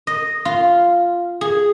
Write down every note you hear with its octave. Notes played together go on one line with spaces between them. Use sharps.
D#5
F4
G#4